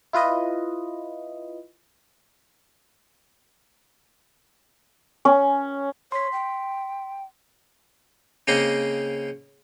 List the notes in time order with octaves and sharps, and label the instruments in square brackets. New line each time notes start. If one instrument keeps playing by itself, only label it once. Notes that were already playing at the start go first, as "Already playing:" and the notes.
[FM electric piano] E4 F4 B4 D#5
[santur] C#4
[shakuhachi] C#5 [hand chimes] C6 B6
[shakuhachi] G5
[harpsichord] C#3 A#3 C4 D#5